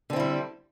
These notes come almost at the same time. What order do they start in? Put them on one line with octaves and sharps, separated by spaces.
D3 C4 E4 G3